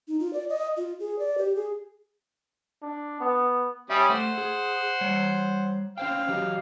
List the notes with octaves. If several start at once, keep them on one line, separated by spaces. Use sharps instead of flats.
D#4
F4
D5
D#5
F4
G#4
D5
G4
G#4
D4
B3
G3 C#4 E5 D#6
A3 C5 F#5
G#4
G3 C#5
C#4 C5 F5 G5
F#3 G4 D#5